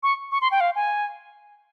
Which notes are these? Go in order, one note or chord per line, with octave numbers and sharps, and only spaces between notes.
C#6
C#6
C6
G5
F5
G#5